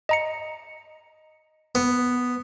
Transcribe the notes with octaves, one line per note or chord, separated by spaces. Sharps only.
D#5 A#5 C#7
B3